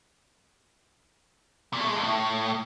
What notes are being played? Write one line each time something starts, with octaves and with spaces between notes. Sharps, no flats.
A#2
A3
G#3
F2
A2